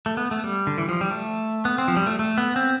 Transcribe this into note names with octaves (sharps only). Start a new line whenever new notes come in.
A3
B3
A3
G3
D3
E3
F3
G3
A3
B3
C4
F3
G3
A3
A3
B3
C4